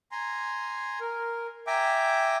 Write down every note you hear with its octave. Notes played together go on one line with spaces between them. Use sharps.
G#5 A#5 C6
A#4
E5 G5 G#5 A#5 D6